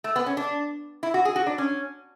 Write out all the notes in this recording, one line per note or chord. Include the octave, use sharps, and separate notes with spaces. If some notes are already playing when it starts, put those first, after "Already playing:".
A3
B3
C#4
D4
E4
F#4
G#4
F#4
D4
C#4